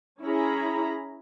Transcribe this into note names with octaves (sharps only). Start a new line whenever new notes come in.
C#4 E4 G#4 A#5 B5